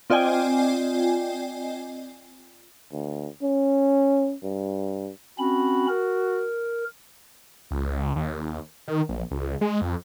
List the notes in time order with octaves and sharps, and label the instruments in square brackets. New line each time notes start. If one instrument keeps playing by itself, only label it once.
[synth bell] C4 F4 D5 D#5 G5 G#5
[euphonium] D2
C#4
G2
[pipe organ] C4 C#4 B5 [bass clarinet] F#4
[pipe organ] A#4
[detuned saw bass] C#2
D#2
D#3
A#1
C#2
G#3
F2